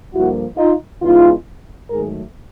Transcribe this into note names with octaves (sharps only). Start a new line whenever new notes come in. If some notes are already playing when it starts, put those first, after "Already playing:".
G2 D3 F3 A#3 E4 F#4
D#4 F4
E2 C#3 E3 G#3 D#4 F4
G#2 D#3 F#3 A3 G#4 A#4